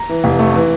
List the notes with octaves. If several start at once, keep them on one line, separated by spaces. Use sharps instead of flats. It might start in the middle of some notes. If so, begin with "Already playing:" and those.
Already playing: A#5
E3
F1
A3
E3